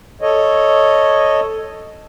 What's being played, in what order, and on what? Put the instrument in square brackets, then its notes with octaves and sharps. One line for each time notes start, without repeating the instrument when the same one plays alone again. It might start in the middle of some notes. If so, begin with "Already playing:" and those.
[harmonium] A4 C#5 D#5